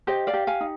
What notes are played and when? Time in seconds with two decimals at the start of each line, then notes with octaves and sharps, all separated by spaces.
0.07 G4 C5 D#5
0.27 D5 F5
0.33 G4
0.47 F5 G#5
0.61 D#4